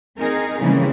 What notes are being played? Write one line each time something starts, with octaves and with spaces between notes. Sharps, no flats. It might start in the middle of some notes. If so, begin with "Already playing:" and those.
C4 D#4 G#4 A#4
C#3 E3 G3 G#3 A#3 C4